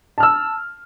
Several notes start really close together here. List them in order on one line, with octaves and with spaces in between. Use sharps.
A5 F6 E6